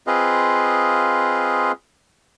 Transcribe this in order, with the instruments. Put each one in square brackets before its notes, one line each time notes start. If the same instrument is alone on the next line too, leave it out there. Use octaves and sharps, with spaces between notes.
[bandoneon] C4 F4 G#4 B4 D#5 F5